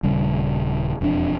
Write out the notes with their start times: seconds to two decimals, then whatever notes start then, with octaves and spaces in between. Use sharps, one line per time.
0.03 D#1 C#3 G3
1.01 E1 F2 C#4 D4